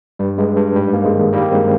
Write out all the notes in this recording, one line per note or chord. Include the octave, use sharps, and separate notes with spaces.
G2 G3
G2 G#3
G2
G#2 G3
G#2 A#3
G#3
D#3
D#3 G3 A#3
G2 G#3 C4